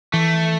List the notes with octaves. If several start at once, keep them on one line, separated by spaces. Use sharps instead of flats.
E3 A3